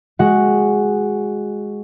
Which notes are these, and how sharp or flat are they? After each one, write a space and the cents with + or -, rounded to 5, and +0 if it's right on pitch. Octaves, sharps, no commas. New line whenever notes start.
G#3 +0 F#4 +0 F#5 +0